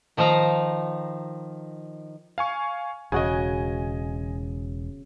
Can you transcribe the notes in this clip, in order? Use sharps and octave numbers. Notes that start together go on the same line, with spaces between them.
D#3 F3 D#4 F5 A#5
F5 G#5 C#6
E1 C#3 F#4 D#5 G#5